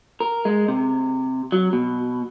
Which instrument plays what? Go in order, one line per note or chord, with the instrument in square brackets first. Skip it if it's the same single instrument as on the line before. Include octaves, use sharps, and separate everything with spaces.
[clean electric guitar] A#4
G#3
C3
F#3
B2